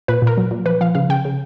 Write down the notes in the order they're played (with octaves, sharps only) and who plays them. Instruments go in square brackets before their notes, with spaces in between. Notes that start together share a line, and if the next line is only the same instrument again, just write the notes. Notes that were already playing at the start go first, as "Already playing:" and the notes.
[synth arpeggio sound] A#2 B4
A#2 A#4
F#3
A#2
F3 B4
F3 F5
C#3 F5
C#3 G5
C#3